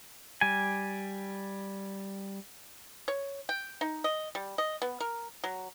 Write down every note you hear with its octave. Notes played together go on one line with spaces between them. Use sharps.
G3 G#5
C#5
G5
D#4
D#5
G3
D#5
B3
A#4
F#3